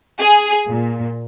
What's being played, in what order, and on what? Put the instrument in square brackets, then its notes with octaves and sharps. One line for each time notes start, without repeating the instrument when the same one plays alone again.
[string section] G#4
A#2